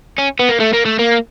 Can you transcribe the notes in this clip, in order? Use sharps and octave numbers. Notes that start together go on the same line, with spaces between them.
C#4
B3
A#3
A3
A#3
A3
A#3